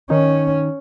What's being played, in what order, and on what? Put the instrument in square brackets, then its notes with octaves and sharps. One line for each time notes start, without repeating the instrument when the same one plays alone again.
[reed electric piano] D#3 D#4 [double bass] C#4